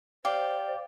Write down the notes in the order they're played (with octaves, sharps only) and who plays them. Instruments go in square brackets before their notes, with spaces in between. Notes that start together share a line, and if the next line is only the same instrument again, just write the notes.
[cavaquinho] G4 [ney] C5 [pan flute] D5 [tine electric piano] F5